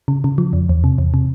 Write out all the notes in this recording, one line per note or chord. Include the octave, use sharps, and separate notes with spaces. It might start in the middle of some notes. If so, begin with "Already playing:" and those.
C#3
C#3
F3
F2
E2
C3
E2
C3